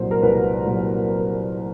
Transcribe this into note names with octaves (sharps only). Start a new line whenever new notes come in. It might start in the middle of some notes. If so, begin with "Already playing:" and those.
Already playing: C2 A#2 F#3 C5
A#4
C2 B4
A#2 F#3